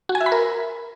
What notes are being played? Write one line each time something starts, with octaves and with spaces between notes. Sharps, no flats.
F#4
G#5
E5
B5
A#4